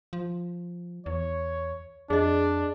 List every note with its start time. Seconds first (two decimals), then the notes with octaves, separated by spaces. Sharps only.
0.13 F3
1.06 E2 C#5
2.10 F2 D4 G#4 D#5